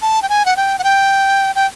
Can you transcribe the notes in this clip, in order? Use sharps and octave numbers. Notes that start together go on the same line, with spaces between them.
A5
G5
G#5
F#5
G5
F#5
G5
G5